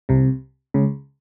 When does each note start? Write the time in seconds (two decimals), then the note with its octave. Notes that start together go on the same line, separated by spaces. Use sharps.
0.09 C2 C3
0.74 C#2 C#3